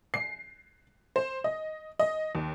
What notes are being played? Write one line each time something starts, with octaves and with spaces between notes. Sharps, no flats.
C7
C5
D#5
D#5
D#2